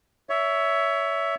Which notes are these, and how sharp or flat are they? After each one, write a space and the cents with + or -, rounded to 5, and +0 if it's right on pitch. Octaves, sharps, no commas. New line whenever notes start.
C#5 +25 E5 +0